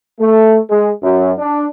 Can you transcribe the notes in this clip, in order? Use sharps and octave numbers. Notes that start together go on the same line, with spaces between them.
A3
G#3
F#2
D4